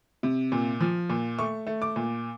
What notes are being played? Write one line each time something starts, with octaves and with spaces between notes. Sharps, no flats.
C3
A#2
F3
A#2
A3 C#6
A3
D6
A#2